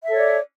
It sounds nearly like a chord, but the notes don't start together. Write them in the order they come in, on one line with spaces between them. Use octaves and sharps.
E5 A4 C#5 D5